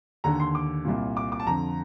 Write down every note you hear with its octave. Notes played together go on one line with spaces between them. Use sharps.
D#2 D3 A#5
C6
D6
C2 A#2
D6
D6
A5
F2 D3 A#5